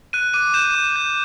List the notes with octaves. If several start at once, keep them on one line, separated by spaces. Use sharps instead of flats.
F#6 D#7
D6 D#7
G6 E7
D6
G6